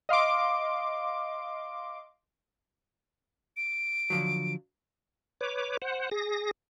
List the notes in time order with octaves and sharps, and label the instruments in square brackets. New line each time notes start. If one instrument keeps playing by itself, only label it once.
[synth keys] D#5 F5 C6 D6
[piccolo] D7
[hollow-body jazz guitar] D3 F3 F#3
[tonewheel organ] B4 C#5 D6
C5 F#5
G#4 A#6